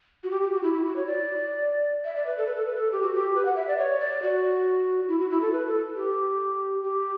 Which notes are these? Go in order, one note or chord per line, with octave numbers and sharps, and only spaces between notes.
F#4
G4
G4
F#4
E4
E4
F#4
C#5
D5
E5
D5
B4
A4
B4
A4
B4
A4
G4
F#4
G4
B4
F#5
E5
D5
C#5
D5
F#4
E4
F#4
E4
A4
B4
A4
G4
G4